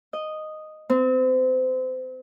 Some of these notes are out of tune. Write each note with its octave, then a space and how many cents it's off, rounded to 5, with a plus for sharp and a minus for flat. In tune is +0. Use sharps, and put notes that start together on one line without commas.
D#5 -5
C4 -30